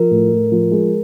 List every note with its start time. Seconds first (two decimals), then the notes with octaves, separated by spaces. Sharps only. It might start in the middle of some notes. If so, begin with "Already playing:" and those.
Already playing: F3 A#4
0.11 A2
0.32 A2
0.52 F3
0.72 G#3